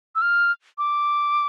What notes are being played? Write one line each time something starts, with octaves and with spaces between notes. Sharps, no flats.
E6
F6
D6